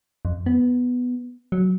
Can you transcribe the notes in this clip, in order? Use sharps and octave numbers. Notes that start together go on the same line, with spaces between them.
F2
B3
F#3